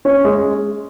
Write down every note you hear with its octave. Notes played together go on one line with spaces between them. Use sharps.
C#4
G#3